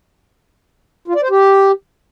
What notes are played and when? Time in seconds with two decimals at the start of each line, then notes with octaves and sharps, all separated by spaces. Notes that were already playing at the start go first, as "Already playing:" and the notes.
1.08 F4
1.15 D5
1.23 C5
1.30 G4